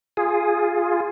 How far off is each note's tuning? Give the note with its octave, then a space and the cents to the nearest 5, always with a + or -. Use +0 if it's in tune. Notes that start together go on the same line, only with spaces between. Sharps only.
F4 +0 G#4 +0